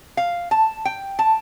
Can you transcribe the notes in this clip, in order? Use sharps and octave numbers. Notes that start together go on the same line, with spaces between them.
F5
A5
G5
A5